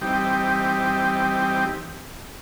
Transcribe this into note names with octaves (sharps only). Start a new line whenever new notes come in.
E3 G3 C4 D#4 G4